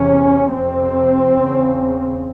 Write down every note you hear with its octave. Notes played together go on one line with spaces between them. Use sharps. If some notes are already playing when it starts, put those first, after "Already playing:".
Already playing: E2 C3 C#4
F2 C3 C4
E2 C#3